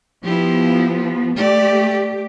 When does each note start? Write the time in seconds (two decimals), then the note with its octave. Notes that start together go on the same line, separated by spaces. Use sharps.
0.23 F3 B3 E4 G4
1.36 A3 G4 D5